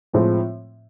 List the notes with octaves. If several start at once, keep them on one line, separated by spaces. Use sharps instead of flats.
A2 F3 G#3 C4